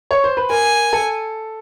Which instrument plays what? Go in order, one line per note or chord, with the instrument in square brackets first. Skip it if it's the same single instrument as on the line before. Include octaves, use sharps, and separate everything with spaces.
[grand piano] C#5
C5
B4
[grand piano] A#4 [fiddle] G#5
[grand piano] A4